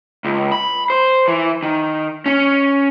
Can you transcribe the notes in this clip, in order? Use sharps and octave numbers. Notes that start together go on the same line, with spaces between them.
C#2
B5
C5
E3
D#3
C#4